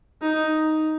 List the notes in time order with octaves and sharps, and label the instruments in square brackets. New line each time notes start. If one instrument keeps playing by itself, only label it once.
[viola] D#4